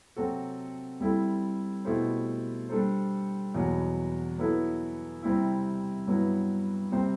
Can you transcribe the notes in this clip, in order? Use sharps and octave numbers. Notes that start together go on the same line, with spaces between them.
C3 F#3 C4 F#4 A4
G3 C4 E4 A4
B2 A3 E4 G4 C5
G3 D4 A4 C5
E2 B2 F#3
F#3 B3 E4 A4
C3 G3 C4 E4
G2 F#3 B3 E4
C3 G3 C4 G4 C5